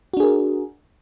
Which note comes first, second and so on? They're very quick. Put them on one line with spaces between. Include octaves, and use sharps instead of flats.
F#4 D4 G#4 A#4